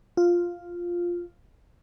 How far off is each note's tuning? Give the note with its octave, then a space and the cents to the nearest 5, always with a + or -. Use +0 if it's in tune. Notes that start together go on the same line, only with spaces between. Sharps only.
F4 +0